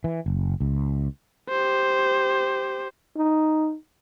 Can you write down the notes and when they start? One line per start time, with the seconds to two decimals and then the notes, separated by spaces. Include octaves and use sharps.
0.04 E3
0.26 F#1
0.60 C#2
1.50 G4 C5
3.17 D#4